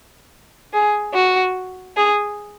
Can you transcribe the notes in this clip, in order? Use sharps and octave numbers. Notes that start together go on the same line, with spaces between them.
G#4
F#4
G#4